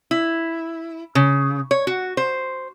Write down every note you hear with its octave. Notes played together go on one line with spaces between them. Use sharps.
E4
C#3
C#5
F#4
C5